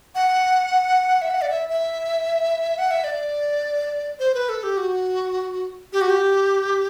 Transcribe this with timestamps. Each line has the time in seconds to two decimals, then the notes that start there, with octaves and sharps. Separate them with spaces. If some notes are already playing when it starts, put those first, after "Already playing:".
0.15 F#5
1.22 E5
1.30 F#5
1.42 D5
1.50 E5
1.69 E5
2.78 F#5
2.91 E5
3.04 D5
4.19 C5
4.35 B4
4.49 A4
4.63 G4
4.77 F#4
5.93 G4
6.01 F#4
6.10 G4